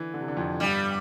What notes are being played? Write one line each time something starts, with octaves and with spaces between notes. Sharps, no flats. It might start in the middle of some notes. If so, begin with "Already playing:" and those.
Already playing: D3 E3
D3
C3
D3
F2
G2 G3 B3